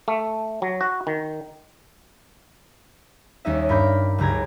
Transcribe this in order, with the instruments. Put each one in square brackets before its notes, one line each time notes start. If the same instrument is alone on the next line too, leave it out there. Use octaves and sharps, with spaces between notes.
[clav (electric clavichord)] A3
F#3
F#4
D#3
[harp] D#2 G3 C#4 D#4 D#5 E5
G2 A#4 B5 D6 G6
F#1 C#2 G4 A#5 G#6